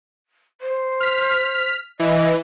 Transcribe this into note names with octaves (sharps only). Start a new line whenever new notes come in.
C5
F6 B6
E3 D#5